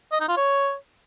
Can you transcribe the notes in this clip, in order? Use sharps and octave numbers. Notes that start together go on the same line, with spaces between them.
D#5
D#4
F4
C#5